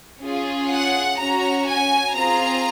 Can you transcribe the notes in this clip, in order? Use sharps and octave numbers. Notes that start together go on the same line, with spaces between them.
C#4 F4 G#4
F#5
C#4 F#4 A#5
G#5
C4 F4 G#4 A#5